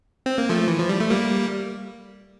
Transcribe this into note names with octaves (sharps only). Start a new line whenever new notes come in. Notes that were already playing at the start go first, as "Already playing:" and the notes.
C4
A#3
F3 A3
E3
F3
G3
A3
G3 A#3